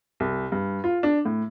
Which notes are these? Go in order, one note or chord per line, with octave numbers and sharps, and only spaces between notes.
C2
G2
F4
D4
A2